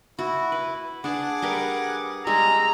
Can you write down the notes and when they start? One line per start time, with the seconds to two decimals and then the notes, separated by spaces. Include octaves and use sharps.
0.19 E4 F#4
0.52 B4
1.04 D4 G#4 F#5 A5 D6
1.42 G3 A#4 B4
2.27 G3 G#3 G#4 D#5 A#5 E6